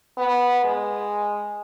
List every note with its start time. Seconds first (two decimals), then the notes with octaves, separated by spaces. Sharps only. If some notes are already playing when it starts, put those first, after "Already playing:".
0.17 B3
0.64 G#3